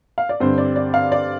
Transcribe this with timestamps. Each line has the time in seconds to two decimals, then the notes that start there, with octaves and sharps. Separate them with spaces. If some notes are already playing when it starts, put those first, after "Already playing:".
0.18 F5
0.29 D5
0.40 G2 D3 G3 C4 C5
0.58 D5
0.76 D5
0.94 F5
1.12 D5